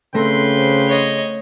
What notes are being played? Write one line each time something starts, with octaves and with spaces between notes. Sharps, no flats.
C#3 A3 C4 B4 G5 C6 A#6
C5
C#5 D#5